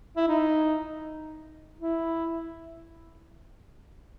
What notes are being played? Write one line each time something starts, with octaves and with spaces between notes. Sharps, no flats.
E4
D#4
E4